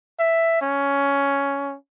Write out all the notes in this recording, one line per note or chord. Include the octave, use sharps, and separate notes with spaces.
E5
C#4